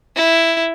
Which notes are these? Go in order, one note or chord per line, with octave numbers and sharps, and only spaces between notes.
E4